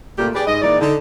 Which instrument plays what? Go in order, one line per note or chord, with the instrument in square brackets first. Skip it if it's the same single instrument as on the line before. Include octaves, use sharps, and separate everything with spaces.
[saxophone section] A#2 C#3 A3 A#3 F4 G4
G4 G#4 B4 D5
G#2 D#5
A#2 E3 G#3 D#4 D5
D3 D#4